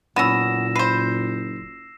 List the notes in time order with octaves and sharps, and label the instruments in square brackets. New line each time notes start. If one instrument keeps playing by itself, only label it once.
[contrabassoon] F#1 [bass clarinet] A#2 [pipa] B3 C#4 [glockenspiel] E6 A#6 E7
[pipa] B4 C5 [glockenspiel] C7